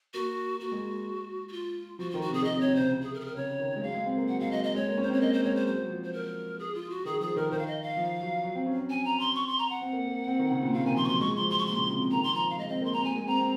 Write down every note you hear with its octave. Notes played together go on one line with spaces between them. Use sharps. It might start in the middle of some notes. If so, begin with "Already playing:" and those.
A#3 F#4
A#3 F#4
G#3
F#4
F4
F3 F#4
D#3 F4
F#4
C3 G#4
C3 D#5
C3
C#5
C3
C#3 C5
C3
G#4
A#4
G#4
A#4
C#3 C#5
D#3
G#3
F#3 F5
G#3
C4
A#3
F#3 F#5
G#3 F5
F#3 D#5
D#5
G#3 C#5
A#3
C#4
C5
C4 C#5
A#3 D#5
C5
G#3 C#5
C5
F#3 C5
F#3
F3
C5
A#4
G#4
F4
F#4
D#3 G#4
F3 G#4
D#3 A#4
D#3 C5
F5
D#5
F5
F3
F#3
F#3
C4
C#4
C4
G#5
A#5
C6
C#6
C6
A#5
F#5
C4
A#3
A#3
C4
D#3
C#3
A#2
C3 F5
D#3 G#5
F3 C6
C#6
F#3 C6
G#3 C#6
F3 C6
F#3
C6
C#6
A#2 C6
C#3
C3
C3
D#3 A#5
C6
F3 A#5
F5
G#3 D#5
C4 D#5
A#3 C6
C4 A#5
A#3 G#5
G#3
C4 A#5
C4